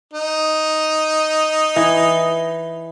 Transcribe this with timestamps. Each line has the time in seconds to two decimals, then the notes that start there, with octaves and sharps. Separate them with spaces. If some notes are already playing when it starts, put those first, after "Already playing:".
0.14 D#4
1.76 E3